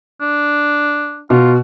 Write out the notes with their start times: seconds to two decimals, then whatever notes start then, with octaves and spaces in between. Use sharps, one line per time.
0.21 D4
1.30 B2 F4